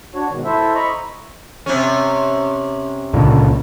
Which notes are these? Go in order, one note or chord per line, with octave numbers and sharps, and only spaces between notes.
D4 F#4 C#5
G#2 B2 D#3
E4 A4 C5 E5
D#5 A#5 B5 C#6
C3 C#4
C#2 A#2 D3